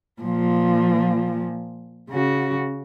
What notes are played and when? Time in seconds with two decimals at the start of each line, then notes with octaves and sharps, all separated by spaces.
0.22 A#2 F3
2.10 C#3 F#4